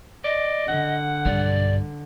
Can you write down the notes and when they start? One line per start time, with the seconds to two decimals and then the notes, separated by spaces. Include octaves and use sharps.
0.24 D5 D#5
0.68 D3 F#5
1.25 B1 G2 D5